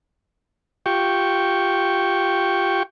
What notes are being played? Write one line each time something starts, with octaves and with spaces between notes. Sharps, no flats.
F4 G4 G5 C#6